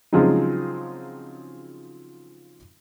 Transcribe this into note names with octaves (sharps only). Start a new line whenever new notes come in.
C#3 F3 F#3 G#3 C4 D#4